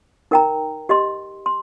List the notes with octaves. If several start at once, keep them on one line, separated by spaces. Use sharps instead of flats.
D#4 A#4 G5 A#5
G4 D#5 C6
C6